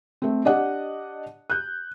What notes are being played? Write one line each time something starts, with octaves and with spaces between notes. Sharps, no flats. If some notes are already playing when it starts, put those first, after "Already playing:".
A3 C4
D4 G4 D5 D#5 F#5
F#6 G6